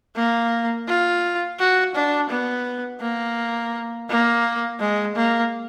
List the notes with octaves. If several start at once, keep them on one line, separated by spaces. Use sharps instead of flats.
A#3
F4
F#4
D4
B3
A#3
A#3
G#3
A#3